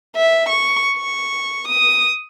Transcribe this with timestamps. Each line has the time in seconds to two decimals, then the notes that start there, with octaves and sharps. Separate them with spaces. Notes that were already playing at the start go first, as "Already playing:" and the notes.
0.16 E5
0.49 C#6
0.98 C#6
1.68 D#6